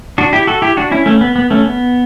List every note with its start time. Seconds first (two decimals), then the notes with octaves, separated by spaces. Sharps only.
0.18 D4 F#4
0.33 E4 G4
0.47 F#4 A4
0.62 E4 G4
0.77 D4 F#4
0.91 C#4 E4
1.06 A3 C#4
1.21 B3
1.36 B3
1.50 A3 C#4
1.66 B3